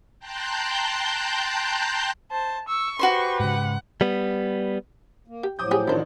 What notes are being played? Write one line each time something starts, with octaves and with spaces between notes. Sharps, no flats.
G5 A5 A#5 C6 F#6 G6
C5 A5
C#6 E6
F#4 G4 B4 C5 C6
G#2 C#3 F#5
G3 B3
A#3
G4
A2 F3 F#3 D6 D#6 G6
G4 G#4
A1 D#3 D4 E4 C5